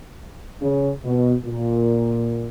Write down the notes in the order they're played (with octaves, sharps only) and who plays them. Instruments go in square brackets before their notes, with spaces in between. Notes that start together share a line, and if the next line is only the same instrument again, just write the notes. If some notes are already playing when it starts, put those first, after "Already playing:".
[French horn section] C#3
B2
A#2